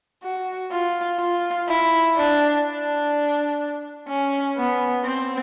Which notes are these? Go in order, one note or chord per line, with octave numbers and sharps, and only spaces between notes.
F#4
F4
F4
E4
D4
D4
C#4
B3
C4